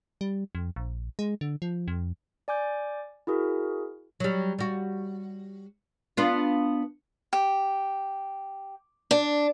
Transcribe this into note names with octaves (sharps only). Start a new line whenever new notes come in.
G3
F2
A#1
G#3
D3
F3
F2
D5 G#5 D6 G6
E4 F#4 G#4 A#4
F#3 G3
G3 F#4
B3 D4 F4
G4
D4